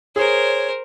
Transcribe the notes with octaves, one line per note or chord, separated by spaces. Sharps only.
G#4 A#4 C5 C#5